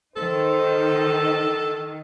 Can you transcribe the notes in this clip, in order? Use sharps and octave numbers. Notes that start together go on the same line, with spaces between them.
D#3 D#4 A4 C5